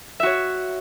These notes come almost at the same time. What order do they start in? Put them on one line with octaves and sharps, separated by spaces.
E5 F#4 C#5